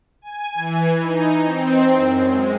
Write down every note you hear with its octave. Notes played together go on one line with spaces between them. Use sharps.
G#5
E3
D#4
C4
F#2
G#3